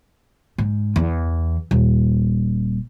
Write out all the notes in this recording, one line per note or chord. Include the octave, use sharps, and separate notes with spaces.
G#2
E2
D#1